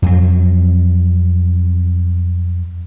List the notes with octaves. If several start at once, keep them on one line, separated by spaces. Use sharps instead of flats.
F2 F#3